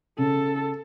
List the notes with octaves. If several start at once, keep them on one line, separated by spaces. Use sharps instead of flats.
C#3 A4